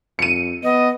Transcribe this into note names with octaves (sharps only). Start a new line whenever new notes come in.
F2 C#7 D#7
B3 D#5